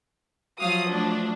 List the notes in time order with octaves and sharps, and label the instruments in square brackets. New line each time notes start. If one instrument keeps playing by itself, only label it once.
[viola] F3 F#3 [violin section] F5 D#6
[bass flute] A3 [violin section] D4